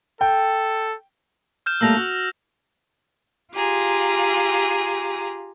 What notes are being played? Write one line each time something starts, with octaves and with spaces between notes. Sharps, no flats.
A4 G5
F6 G6 E7
G3 A3 A#3 E6 A#6 F7
F#4
F4 G4 G#4 A#5